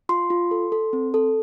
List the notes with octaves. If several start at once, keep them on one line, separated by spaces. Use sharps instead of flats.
F4 C6
F4
A4
A4
C4
A4